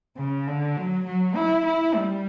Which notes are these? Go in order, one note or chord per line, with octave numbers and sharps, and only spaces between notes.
C#3
D3
F#3
F#3
E4
E4
G3